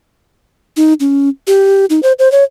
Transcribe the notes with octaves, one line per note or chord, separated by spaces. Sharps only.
D#4
C#4
G4
D#4
C5
C5
C#5